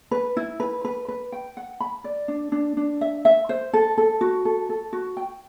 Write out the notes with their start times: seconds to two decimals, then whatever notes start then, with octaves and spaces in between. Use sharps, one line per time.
0.11 B4
0.37 E4
0.60 B4
0.85 B4
1.08 B4
1.32 G5
1.57 F#5
1.80 B5
2.04 D5
2.28 D4
2.52 D4
2.77 D4
3.01 E5
3.25 E5
3.49 C5
3.73 A4
3.98 A4
4.21 F#4
4.45 A4
4.69 A4
4.93 F#4
5.17 G5